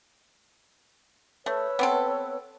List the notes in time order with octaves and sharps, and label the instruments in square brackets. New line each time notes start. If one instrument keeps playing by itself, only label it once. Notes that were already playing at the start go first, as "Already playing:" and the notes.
[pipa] A3 [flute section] B4 C#5 E6
[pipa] B3 C4 A4